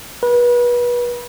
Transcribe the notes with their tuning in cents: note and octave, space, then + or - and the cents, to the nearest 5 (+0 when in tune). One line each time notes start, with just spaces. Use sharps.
B4 -30